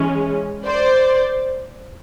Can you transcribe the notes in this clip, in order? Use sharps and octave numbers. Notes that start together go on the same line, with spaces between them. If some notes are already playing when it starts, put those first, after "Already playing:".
Already playing: E3 G#3 C#4
C5 D5